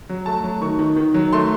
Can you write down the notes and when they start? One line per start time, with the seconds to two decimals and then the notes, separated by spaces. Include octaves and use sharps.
0.09 F#3
0.26 A3 A5
0.44 F#3
0.61 D#3 C#6
0.79 D#3
0.96 D#3
1.14 F#3
1.33 A3 C6